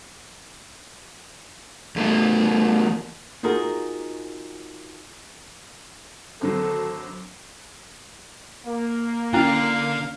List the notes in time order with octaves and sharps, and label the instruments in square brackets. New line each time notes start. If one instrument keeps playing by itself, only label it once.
[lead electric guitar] E2 A3
[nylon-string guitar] D#4 F4 F#4 G#4 A#4
[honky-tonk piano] G#1 D3 F#3 [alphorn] A4
[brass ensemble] A#3
[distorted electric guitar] D3 [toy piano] C#4 E4 [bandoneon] F5